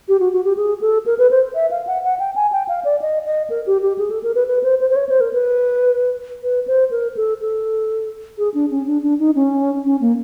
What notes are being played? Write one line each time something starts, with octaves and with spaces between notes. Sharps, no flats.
G4
F#4
F#4
G4
G#4
A4
A#4
B4
C5
E5
F5
F#5
F#5
G5
G#5
G5
F5
D5
D#5
D#5
A#4
G4
G4
G#4
A4
A#4
B4
B4
C5
C5
C5
C#5
C5
A#4
B4
B4
C5
A#4
A4
A4
G#4
D4
C#4
D4
D4
D#4
C#4
C#4
A#3